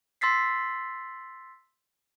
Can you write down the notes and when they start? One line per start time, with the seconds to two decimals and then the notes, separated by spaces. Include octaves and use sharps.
0.21 C6 E6 A6 B6 C7